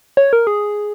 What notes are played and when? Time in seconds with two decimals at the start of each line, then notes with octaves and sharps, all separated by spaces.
0.17 C#5
0.33 A#4
0.47 G#4